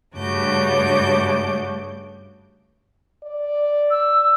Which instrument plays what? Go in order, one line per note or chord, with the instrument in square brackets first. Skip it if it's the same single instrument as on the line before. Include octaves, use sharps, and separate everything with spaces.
[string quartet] G2 C#3 A3 F#4 D6 G6
[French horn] D5
[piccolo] E6